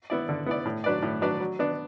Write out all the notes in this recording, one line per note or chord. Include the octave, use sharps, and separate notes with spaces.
B3 E4 D5
D3
B3 E4 D5
A2
F#3 D4 B4 D5
A2
F#3 D4 B4 D5
F#3
B3 D4